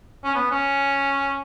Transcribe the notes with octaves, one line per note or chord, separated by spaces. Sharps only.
C#4
B3
C#4